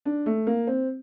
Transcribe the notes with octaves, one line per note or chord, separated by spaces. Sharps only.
D4
A3
A#3
C4